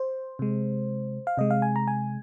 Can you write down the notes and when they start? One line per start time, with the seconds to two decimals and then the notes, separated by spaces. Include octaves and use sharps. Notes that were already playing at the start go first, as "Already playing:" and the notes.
Already playing: C5
0.39 C3 G#3
1.27 F5
1.37 C3 G#3 D#5
1.51 F5
1.62 G#5
1.76 A#5
1.88 G#5